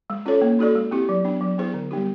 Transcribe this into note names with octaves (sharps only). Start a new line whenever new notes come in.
G#3
C#4 F4 A4 C#5
A#3
D#4 F#4 A4 D5
G#3
C4 E4 G4
F#3
B3 D4
F#3
B3 E4 G#4 C5
D3
G3 B3 D#4 G4